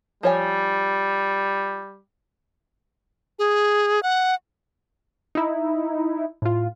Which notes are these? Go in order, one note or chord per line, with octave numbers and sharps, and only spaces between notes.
F3 G3 C#5 G#5
G#4
F#5
D#4 E4
A2 F4